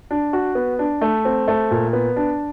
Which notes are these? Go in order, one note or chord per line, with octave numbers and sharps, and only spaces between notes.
D4
F#4
B3
D4
A3
C4
A3
A#2
B3
D4